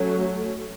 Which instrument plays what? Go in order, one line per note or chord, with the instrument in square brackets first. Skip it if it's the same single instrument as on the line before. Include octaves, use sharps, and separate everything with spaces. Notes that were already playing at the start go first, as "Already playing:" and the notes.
Already playing: [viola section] F#3 A3 C#4